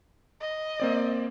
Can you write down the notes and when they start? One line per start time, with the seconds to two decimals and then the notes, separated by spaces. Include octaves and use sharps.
0.41 D#5
0.80 A#3 C4 D5